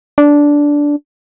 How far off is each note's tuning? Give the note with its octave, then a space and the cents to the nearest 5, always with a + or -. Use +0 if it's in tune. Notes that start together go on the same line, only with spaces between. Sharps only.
D4 -10